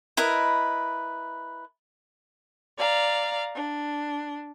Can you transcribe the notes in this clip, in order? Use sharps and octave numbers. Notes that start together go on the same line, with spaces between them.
E4 A#4 B4 D#5
D5 F5 A#5
D4